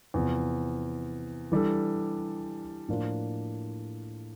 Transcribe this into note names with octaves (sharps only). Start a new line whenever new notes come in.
E2 C3 F3
E3 G3 D4 A4
A2 F3 A#3 D4 F4